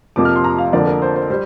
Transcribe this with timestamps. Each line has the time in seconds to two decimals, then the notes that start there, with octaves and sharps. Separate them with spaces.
0.16 F2 C3 F3 A#3 D6
0.25 F6
0.36 C6
0.44 A#5
0.59 F5
0.73 F2 D3 F3 A#3 D5
0.87 A#4
1.02 C5
1.16 C5
1.30 G3 C5